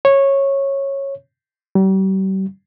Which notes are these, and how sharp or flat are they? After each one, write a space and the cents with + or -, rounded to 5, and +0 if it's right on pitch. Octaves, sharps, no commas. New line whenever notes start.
C#5 -15
G3 -40